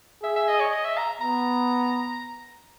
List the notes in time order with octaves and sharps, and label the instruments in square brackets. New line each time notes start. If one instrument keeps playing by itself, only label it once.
[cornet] G#4 [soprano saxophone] E5
[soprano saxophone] E5
D#5
C#5
D#5
E5
A#5
[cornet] B3 [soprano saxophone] A#5